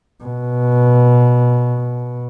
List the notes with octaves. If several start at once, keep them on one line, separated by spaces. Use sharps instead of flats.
B2